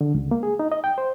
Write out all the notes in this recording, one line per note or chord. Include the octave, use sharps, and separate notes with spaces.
D3
C#2
A#3
G#4
D#4
D#5
G5
C5